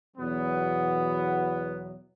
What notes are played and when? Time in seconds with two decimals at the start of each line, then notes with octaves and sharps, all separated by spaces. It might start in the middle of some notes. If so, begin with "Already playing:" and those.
0.17 E2 B2 F#3 B3